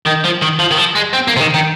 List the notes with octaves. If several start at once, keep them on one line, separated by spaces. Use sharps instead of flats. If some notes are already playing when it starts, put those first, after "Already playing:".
D#3
F3
D#3
F3
D#3
F3
G#3
C4
A#3
C3
D#3
D#3